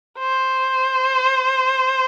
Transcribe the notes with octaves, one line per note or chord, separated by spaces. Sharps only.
C5